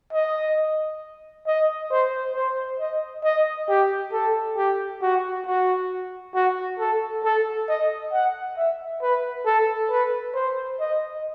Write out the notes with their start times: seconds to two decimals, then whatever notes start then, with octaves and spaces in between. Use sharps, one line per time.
0.13 D#5
1.47 D#5
1.91 C5
2.35 C5
2.79 D#5
3.24 D#5
3.69 G4
4.13 A4
4.57 G4
5.02 F#4
5.46 F#4
6.35 F#4
6.79 A4
7.24 A4
7.68 D#5
8.13 F#5
8.57 E5
9.02 B4
9.46 A4
9.90 B4
10.34 C5
10.80 D#5